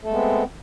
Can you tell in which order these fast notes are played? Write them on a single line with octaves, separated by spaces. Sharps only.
A3 A4 G#3 B3 C4